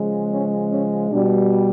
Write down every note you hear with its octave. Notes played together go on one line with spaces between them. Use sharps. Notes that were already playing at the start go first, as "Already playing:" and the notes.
Already playing: C#3 F3 G#3
C#4
C#4
B2 G3 D4